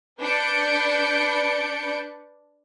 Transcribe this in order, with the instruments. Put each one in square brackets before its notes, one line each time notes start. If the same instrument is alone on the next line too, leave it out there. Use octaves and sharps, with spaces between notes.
[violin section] D4 B4 D5 G6 C#7 D7